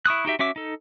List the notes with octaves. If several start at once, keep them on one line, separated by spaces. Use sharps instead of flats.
E4 C#6 D#6 F#6
D#4 F#4 G4 E5
C#4 F#4 E5 D6
D#4 A4